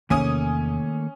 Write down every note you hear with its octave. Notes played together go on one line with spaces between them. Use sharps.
E2 C3 D#3 A3 A#3 C#4 G#5 D#6